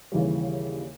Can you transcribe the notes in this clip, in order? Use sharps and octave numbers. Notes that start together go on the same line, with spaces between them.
D#2 C#3 E3 G3